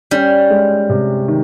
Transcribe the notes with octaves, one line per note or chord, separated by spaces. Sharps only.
G3 C#4
G#3
C3
D#3